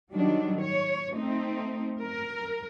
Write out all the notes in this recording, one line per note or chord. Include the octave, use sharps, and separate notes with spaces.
D#3 F#3 G3 D4
C#5
A3 C4 D#4
A#4